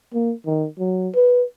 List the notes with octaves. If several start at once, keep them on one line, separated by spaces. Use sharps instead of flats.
A#3
D#3
F#3
B4